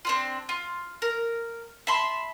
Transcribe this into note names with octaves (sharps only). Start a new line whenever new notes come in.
C4 D4 F4
F4
A#4
E5 A5 B5 C6